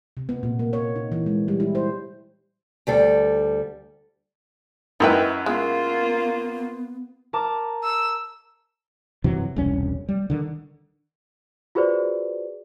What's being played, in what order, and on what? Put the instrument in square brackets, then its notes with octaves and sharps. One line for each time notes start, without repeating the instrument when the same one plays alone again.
[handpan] C3
B3
A#2
A#3
C#5
D#4
E3
G#3
G3
E4
C5
[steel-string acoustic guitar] D2 G3 A4
[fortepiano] F#2 E4 B4 [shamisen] D#4 A#4 G5 [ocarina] D#5
[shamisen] G#3 [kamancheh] A#3 F4 [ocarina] B3
[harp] A#4 A5 D6
[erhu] E6
[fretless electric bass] G2 C3 E3 F#3
E1 C2 G2 C#4
G3
D3 D#3
[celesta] F4 F#4 G#4 B4 C5 D5